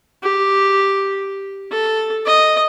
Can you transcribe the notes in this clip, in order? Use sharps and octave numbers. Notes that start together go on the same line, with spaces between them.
G4
A4
D#5